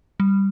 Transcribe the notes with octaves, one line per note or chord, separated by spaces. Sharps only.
G3